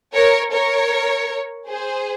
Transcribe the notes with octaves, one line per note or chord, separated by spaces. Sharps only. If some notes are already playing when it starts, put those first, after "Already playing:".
A#4 C#5
A#4 C#5
G#4 C5